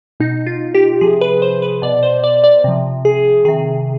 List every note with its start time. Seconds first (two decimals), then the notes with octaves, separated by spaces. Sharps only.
0.20 B2 D#4
0.47 F4
0.74 G4
1.01 C3 F3 G#4
1.21 B4
1.42 C5
1.62 B4
1.82 B2 D5
2.03 C5
2.24 D5
2.44 D5
2.64 C3 F3
3.05 G#4
3.45 C3 D#3 G#4